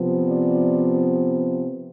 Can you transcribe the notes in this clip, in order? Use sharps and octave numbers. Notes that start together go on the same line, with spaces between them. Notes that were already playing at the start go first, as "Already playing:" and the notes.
Already playing: C3 F3 B3
D5